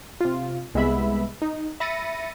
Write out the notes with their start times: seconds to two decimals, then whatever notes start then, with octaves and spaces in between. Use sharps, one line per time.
0.20 C3 F4
0.74 C2 G#3 B3 E5 B5
1.42 D#4
1.80 E5 B5 A6 A#6 C#7 D#7